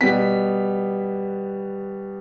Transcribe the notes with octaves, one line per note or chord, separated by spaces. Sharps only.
B2 G3 B3 B6